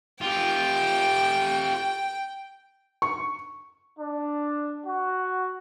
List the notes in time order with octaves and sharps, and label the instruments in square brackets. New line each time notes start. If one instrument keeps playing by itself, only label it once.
[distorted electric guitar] F4 G4 [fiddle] G5
[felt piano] C#6
[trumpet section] D4
F#4